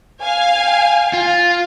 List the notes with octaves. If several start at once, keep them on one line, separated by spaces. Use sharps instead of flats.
F5 G#5
F4